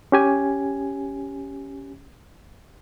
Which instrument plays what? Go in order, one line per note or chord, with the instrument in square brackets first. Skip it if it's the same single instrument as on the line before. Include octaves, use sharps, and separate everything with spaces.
[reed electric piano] C#4 G4 G#5